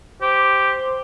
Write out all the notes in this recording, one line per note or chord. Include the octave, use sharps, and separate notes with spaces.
G4 C5